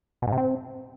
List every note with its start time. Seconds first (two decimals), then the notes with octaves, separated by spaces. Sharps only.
0.22 B2
0.27 G#2
0.32 C3
0.38 C4